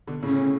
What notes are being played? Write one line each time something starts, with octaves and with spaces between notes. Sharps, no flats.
B2 D3
A2 C#3
C#4